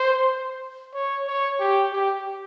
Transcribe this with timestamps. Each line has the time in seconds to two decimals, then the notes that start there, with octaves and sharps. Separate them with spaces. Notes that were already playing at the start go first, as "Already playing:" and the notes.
Already playing: C5
0.94 C#5
1.27 C#5
1.60 G4
1.93 G4